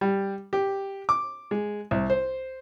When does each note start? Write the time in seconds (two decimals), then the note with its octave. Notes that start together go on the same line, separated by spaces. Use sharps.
0.01 G3
0.53 G4
1.09 D6
1.51 G#3
1.91 C2
2.10 C5